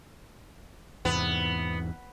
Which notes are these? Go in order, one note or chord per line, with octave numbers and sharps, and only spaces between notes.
E2 G#2 C3 B3